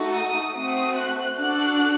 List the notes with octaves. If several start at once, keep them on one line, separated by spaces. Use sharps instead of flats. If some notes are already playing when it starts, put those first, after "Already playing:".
Already playing: A3 D#4 F#4 A4
D#6
A3 C4 F#4 D#6
F#6
D4 F#4 A4 F#6